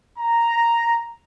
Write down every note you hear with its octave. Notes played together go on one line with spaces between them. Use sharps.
A#5